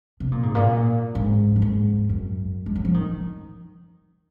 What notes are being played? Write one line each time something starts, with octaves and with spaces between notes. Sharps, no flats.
C3
A#2
G#2
A#2
G#2
F#2
G#2
F#2
G#3
F#3
F3
D#3